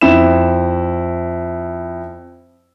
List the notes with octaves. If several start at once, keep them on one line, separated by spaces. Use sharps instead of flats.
F2 E4 E7